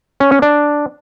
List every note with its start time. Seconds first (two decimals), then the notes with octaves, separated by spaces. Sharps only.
0.20 C#4
0.31 C#4
0.42 D4